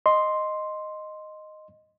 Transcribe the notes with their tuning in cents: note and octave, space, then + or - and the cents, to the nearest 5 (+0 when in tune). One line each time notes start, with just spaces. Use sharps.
D#5 -5 C6 +0